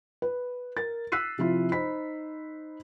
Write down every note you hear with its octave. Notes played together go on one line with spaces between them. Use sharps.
B4
A#4 A6
E6 F#6 B6 C7 D#7
C3 F3 E4 F4
D#4 C5 B5 B6